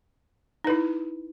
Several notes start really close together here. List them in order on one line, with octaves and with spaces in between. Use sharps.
D#4 B4 E4